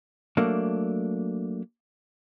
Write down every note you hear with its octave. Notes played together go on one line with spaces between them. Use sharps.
F#3 A3 A#3 D4